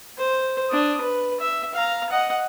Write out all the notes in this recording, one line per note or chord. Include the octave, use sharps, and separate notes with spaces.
C5
D4 D#6
B4
E5
F5 A#5
D#5 F#5